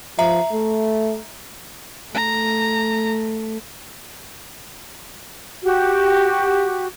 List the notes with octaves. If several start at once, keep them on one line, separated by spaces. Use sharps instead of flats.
F3 E5 A#5
A3
A3 A#5
F#4 G4